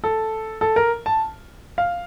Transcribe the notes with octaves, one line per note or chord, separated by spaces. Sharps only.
A4
A4
A#4
A5
F5